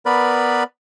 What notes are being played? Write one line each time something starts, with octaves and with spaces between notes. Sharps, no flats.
B3 A#4 B4 D5 B5